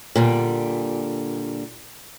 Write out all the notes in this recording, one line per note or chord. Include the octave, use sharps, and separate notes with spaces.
A#2 D3 G3